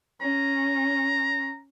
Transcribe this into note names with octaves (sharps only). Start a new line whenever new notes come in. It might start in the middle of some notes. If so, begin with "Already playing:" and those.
C#4 A#5